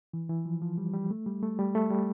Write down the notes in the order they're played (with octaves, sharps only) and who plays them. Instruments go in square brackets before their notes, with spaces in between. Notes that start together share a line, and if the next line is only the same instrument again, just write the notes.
[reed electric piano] E3
E3
F3
F3
G3
G3
A3
G3
A3
G3
A3
G3